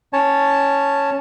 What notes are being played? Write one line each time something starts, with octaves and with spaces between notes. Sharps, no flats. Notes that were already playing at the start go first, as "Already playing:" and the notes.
C#4 C#5 A5